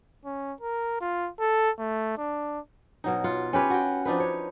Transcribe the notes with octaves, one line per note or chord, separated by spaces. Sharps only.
C#4
A#4
F4
A4
A3
D4
B2 F#3 D#4
F4 F#5
C#4 G4 B4 C#5
F#4 G5
F3 D4 D#4 B4
C#5